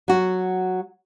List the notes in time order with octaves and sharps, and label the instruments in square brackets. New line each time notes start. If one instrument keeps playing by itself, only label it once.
[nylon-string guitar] F#3 F#4